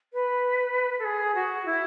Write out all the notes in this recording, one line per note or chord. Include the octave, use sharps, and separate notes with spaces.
B4
A4
G#4
F#4
E4